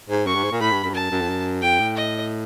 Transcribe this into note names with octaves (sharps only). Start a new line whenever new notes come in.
G#2
F#2 C#6
G2
G#2
A#2
A2 B5
G2
F#2
G2
F#2 A5
F#2
F2
F#2
F2 G5
A2
D#5